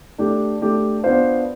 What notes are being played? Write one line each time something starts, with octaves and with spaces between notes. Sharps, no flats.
A3 D4 G4
A3 D4 G4
B3 D4 F4 C5 F5